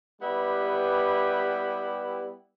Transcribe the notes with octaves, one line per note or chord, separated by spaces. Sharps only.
G3 B3 E4 G4 B4